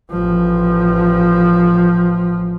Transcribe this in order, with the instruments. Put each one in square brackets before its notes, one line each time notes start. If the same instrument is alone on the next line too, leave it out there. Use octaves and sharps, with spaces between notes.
[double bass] A1 F3